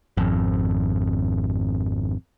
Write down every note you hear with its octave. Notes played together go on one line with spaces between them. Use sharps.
G#1 F2